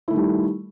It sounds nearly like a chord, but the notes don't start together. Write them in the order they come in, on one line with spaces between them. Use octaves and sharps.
E4 A3 D#3 G3